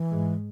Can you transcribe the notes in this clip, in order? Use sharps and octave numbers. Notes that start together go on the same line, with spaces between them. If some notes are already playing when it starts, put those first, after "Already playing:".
Already playing: E3
G#2 G#3